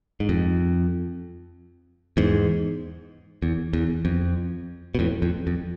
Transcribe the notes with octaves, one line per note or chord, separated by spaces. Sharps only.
G#2
F2
E2 G#2
E2
E2
F2
B2
F2 A2
F2
F2